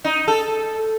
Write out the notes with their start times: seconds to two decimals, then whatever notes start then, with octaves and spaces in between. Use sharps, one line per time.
0.04 D#4
0.28 A4